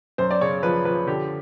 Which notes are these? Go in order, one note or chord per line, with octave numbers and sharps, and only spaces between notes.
F#2 C5
D5
C#3 C#5
F3 B4
F3 B4
D3 G4